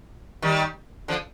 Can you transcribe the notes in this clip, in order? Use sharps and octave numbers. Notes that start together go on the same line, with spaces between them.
D#3 G3
D3 F3